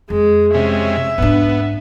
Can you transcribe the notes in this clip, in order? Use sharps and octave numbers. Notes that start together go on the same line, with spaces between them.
F2 G#3
C3 G#3 C#4 E5
G#2 B3 D4